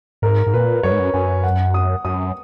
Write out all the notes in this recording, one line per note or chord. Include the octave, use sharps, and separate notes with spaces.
G#2 A#4
G#2
A#2 B4
F#2 C#5
G#2
F#2
F#2 G#5
F#5
D#6
F#2 D#6